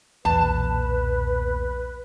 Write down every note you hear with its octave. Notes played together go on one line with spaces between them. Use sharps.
B1 E2 A#2 B4 A5